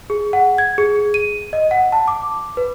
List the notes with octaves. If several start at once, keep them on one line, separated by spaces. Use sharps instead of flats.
G#4
F#5
G#6
G#4
D#7
D#5
F#5
A5
D6
B4